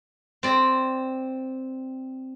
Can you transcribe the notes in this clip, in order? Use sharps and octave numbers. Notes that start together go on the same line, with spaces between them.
C4 D5